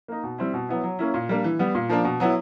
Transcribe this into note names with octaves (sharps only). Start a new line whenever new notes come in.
A#3 D#4
B2
G3 C4 E4
B2
F#3 B3 E4
F#3
A#3 C#4 E4
A#2
G3 A#3 D4
E3
G3 B3
A#2
F3 A#3 D4
B2
F#3 B3 E4